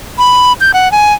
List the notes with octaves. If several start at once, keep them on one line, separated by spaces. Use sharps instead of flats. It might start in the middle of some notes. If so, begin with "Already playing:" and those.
B5
G6
F#5
G#5